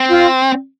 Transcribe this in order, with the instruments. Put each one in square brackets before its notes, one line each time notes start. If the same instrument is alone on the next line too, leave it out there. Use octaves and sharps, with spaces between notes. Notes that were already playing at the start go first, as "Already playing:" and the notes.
Already playing: [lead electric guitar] C4
[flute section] F4